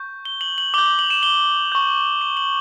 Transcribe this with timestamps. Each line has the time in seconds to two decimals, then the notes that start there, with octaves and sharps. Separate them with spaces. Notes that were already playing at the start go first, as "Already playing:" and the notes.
Already playing: C#6 G6
0.25 G7
0.41 F#7
0.58 F#7
0.74 D6 G7
0.78 G6
0.86 F#7
0.99 F#7
1.10 E7
1.23 G7
1.72 C#6 G6
2.21 F#7
2.37 F#7